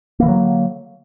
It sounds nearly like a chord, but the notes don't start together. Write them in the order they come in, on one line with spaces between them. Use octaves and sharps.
A#3 E3 D3 F#3